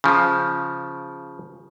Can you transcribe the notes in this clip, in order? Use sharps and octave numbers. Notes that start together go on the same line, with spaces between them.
C#3 F3